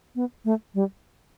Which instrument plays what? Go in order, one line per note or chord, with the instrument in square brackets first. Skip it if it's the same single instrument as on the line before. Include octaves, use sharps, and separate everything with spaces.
[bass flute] B3
A3
G3